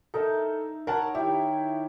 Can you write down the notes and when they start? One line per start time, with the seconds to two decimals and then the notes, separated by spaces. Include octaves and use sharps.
0.14 D#4 A4 A#4 E5
0.87 A#4 C#5 F#5 A5 B5
1.15 D#3 E4 G4